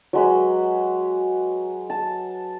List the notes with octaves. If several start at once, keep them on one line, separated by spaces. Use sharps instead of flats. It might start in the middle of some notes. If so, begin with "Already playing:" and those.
F#3 G#3 B4
A5